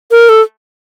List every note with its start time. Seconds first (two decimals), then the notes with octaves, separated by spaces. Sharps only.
0.11 A#4
0.29 A4